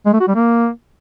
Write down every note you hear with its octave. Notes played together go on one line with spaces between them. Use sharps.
G#3
A3
F#4
G3
A#3